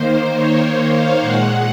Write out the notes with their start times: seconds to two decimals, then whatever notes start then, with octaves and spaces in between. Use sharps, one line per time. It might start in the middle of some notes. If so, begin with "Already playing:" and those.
Already playing: D#3 A#3 C5
0.35 C#5
0.64 C#5
0.92 F5
1.21 A#2 G#3 F#5